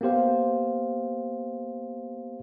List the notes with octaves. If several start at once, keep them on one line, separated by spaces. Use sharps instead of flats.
A#3 B3 G4 C5 F5